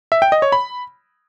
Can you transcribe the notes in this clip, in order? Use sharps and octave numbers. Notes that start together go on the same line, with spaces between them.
E5
G5
D#5
C#5
B5